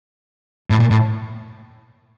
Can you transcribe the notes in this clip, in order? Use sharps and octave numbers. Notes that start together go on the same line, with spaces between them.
A2
A#2
A2